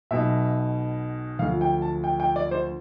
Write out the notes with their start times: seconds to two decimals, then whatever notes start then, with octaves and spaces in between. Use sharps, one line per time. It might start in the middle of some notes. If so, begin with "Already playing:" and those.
0.11 B1 B2 E5
1.39 D2 F5
1.42 D3 F3
1.61 G5
1.82 A5
2.04 G5
2.20 G5
2.36 D5
2.51 C5